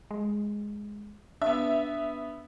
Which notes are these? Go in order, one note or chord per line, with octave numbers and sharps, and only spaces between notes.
G#3
B3 D4 E5